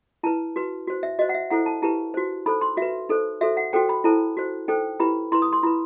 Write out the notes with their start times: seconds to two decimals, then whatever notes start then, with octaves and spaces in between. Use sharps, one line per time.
0.23 E4 B4 A5
0.56 F#4 B4
0.87 F#4 C5
1.03 E5
1.19 F#4 D#5
1.22 C5
1.29 F#5
1.34 E5
1.50 E4 A4 C5 F#5
1.66 A5
1.82 E4 G4 B4 A5
2.14 F#4 C5
2.46 D#4 A4 C5 B5
2.61 C6
2.77 F#4 B4 E5
3.09 D#4 A4 C5
3.41 F#4 A4 C5 E5
3.57 F#5
3.73 F#4 A4 C5 G5
3.89 B5
4.04 E4 A4 C5 A5
4.37 F#4 C5
4.68 D#4 A4 C5 G5
5.00 E4 G4 B4 B5
5.32 E4 C6
5.35 B4
5.42 D#6
5.53 C6
5.63 E4 B5
5.67 B4